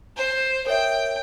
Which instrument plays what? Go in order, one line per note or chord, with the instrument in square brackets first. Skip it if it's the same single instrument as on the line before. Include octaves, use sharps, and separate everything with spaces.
[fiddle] C5
[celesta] A#4 C#5 E5 [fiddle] G5